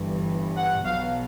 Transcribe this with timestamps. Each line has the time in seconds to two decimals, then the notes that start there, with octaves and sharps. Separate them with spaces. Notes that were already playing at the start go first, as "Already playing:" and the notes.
Already playing: G1 G2 E3
0.58 F#5
0.86 B1 B2 F#3 F5